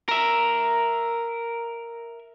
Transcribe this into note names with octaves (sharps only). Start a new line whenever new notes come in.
A#4 E5